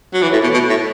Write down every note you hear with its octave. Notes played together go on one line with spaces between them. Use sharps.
F#3
E3
A2
B2
B2
A2